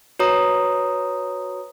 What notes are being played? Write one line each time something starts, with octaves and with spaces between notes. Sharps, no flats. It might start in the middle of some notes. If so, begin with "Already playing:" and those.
F#4 B4 C#5 A#5 D#6